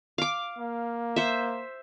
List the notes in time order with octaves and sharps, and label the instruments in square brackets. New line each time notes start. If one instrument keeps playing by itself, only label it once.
[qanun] F5 D6
[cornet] A#3
[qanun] C5 E5